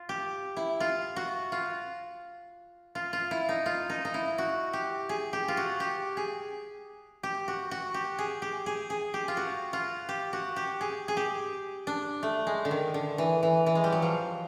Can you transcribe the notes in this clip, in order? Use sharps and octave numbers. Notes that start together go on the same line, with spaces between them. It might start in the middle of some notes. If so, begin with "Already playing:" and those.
Already playing: F4
G4
E4
F4
F#4
F4
F4
F4
E4
D#4
F4
D#4
D#4
E4
F#4
G4
G#4
G4
F4
F#4
G4
G#4
G4
F#4
F#4
G4
G#4
G4
G#4
G#4
G4
F4
F#4
F4
G4
F#4
G4
G#4
G#4
G4
D4
A3
G#3
D3
D#3
D3
E3
E3
E3
G#3
G3
F#3
F3